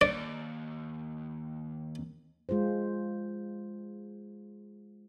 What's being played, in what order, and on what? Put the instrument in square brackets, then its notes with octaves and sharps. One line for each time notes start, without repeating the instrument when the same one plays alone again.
[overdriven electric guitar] D#2 [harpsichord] D5
[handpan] G#3 F4 G#4 C5